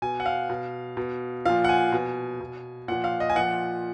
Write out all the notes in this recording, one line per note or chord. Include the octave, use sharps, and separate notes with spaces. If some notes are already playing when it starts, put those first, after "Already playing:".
B2 G#5
F#5
F5
B2
B2
A#2 F3 F5
F#5
G#5
B2
B2
A#2 F3 F#5
F5
D#5
G#5
A#2 F3 F#5